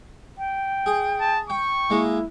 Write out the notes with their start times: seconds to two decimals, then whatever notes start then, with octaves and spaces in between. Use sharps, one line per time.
0.38 G5
0.86 G#4
1.21 A5
1.50 G5 C#6
1.90 G#3 A#3 E4